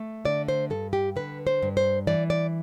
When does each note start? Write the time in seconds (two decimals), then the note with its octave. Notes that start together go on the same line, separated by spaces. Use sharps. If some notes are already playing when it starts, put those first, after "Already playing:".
Already playing: A3
0.25 D3 D5
0.48 C5
0.70 G2 A4
0.93 G4
1.16 D3 B4
1.47 C5
1.62 G2
1.77 C5
2.07 E3 D5
2.30 D5